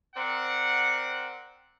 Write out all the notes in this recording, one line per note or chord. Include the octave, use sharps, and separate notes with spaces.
C4 A#4 D5 F#5